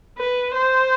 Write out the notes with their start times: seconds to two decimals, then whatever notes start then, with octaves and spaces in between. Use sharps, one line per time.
0.18 B4
0.54 C5